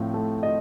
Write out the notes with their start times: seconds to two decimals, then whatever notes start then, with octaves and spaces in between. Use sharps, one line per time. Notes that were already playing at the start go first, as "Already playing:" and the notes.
Already playing: A2 F3 C4
0.14 A3
0.43 D#5